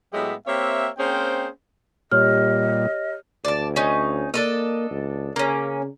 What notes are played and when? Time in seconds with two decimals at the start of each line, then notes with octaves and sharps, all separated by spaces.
0.13 A2 F#3 G#3 B3 G4 E5
0.47 A#3 C4 G4 C#5 E5
0.98 A#3 C4 C#4 G#4 C5 G5
2.11 A#2 G3 G4 C#5 D#5 F6
3.45 D2 D5 A5
3.76 C#4 D#4
4.34 A#3 D4 A4 D#5
4.91 C#2
5.36 C#3 A#3 C#4